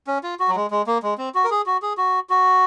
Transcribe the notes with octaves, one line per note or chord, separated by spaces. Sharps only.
C#4
F4
F#4
F#3
G#3
G#3
A#3
G#3
C4
F#4
A#4
G#4
F#4
G#4
F#4
F#4